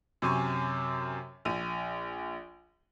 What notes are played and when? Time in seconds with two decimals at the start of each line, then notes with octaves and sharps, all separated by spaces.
0.22 F#2 C3 G#5 C#6
1.45 A#1 D#7